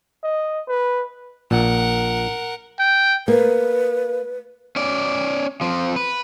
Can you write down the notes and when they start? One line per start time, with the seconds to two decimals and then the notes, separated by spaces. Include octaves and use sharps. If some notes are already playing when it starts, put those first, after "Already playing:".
0.23 D#5
0.68 B4
1.51 A#1 A#2 A#4 F#5
2.79 G5
3.28 A#3 B4
4.76 C#4 D5
5.61 F3 C4
5.96 B4